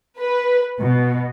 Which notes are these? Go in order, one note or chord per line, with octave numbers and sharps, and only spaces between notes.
B4
B2